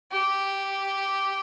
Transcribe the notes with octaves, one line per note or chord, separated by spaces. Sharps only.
G4